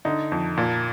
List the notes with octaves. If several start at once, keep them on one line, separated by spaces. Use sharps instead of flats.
D3 D#4
F2
A#2